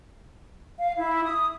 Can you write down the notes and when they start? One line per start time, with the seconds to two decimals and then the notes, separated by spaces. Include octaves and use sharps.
0.79 F5
0.97 E4
1.24 D#6